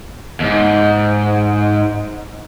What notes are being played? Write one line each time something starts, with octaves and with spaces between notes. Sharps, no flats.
D#2 G#2